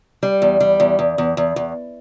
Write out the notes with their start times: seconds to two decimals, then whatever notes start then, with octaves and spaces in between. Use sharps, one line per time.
0.23 G3
0.42 E2
0.60 G3
0.80 E2
0.99 E2
1.18 E2
1.37 E2
1.56 E2